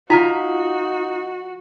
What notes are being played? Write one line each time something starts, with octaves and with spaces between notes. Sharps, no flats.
F3 D#4 F4 F#4 G#5 A#5